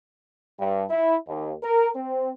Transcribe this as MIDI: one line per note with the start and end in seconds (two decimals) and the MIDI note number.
0.59 0.85 43
0.90 1.16 64
1.27 1.54 39
1.63 1.89 70
1.95 2.31 60